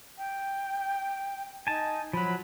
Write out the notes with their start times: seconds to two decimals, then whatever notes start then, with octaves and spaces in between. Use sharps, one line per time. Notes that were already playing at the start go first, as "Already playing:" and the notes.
0.18 G5
1.67 D#4 G#5 A5
2.13 F3 F#3 B5